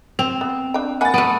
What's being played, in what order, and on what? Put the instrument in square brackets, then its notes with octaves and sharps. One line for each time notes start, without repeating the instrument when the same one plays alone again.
[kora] C4 [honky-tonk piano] F7
[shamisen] B3
D4 G5
[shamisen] A#3 G#5 B5 [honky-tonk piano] F#5 A6
[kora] A3 B3 [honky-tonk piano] D7 D#7